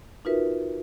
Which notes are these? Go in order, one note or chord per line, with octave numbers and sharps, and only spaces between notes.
D#4 F4 F#4 A#4 B4 E5